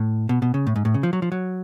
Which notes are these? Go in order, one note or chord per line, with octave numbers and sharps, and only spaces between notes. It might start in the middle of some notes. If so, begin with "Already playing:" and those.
Already playing: A2
B2
B2
C#3
A2
G#2
A2
C#3
F3
F#3
F3
F#3